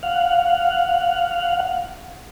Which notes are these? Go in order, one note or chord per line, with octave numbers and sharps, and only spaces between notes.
F5 F#5